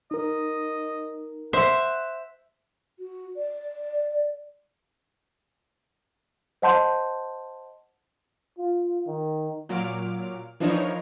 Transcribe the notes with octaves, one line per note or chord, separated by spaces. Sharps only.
D#4 A#4 D#5
C5 E5 F#5
F#4
D5
C5 D#5 F#5 A5 C6 G6
F4
D#3
A#2 F#3 D6 F6 D7
E3 F3 D4 D#4 A#4 C#5